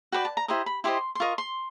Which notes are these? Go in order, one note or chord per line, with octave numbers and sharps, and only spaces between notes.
F#4 B4 D5 G5
A5
A#5
E4 G4 C5 D#5 A#5
B5
E4 G4 C5 D#5 C6
C6
F4 A#4 D#5 C#6
C6